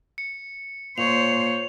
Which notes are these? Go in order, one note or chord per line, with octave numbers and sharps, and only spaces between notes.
C#7
A#2 C5 C#5 F7